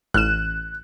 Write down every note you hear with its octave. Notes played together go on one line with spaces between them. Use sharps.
A1 F6 F#6 E7